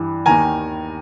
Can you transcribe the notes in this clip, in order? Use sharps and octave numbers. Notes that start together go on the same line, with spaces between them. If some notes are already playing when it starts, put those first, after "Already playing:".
Already playing: G2 E3
D#2 D#3 G#5 A#5